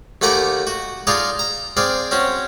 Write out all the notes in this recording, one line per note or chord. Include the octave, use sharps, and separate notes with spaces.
D#2 A3 F#5 G#5 A#5 D6
F#4
D#4 F4 G#4 D5 F5
A#5
C4 G#4 D5 F5
C4 C#4 F#4